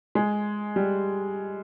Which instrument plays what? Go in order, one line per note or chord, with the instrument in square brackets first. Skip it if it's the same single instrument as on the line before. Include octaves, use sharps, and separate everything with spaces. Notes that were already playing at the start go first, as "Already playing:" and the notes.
[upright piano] G#3
G3